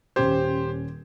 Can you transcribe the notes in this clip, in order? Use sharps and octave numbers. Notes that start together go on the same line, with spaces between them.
D#1 C#4 G4 C5 G#6